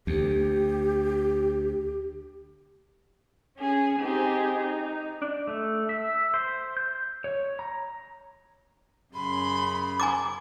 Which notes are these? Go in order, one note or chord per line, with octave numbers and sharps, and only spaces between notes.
D2 G4
C#4 G#4
C4 D#4 G4 G#4
D#4
D4
A3
E5
C5
G6
C#5
A#5
F#2 C#3 B5 C6
G#5 A#5 D6